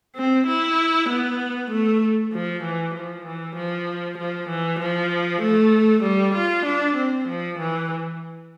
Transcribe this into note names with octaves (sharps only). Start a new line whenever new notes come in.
C4
E4
B3
A3
F3
E3
F3
E3
F3
F3
E3
F3
A3
G3
F4
D4
C4
F3
E3